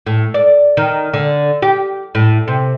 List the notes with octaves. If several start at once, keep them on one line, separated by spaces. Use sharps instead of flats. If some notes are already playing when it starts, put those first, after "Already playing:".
A2
D5
D#3
D3
G4
A2
C3